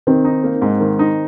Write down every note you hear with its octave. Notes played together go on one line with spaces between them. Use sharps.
D#3 C4
D#4
A#3
G#2
D#3
D#4